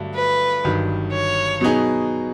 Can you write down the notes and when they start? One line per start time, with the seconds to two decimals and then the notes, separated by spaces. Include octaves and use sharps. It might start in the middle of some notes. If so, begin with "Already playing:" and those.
Already playing: G2 D3 F#3 A3 D4
0.15 B4
0.64 G1 G2 D#3 F#3
1.12 C#5
1.61 B2 F#3 B3 D#4 G#4